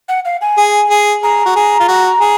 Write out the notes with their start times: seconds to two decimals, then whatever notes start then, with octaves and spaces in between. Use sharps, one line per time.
0.09 F#5
0.25 F5
0.41 G#5
0.58 G#4
0.90 G#4
1.23 G#4 A#5
1.46 F#4
1.56 G#4
1.80 F4
1.88 F#4
2.21 G#4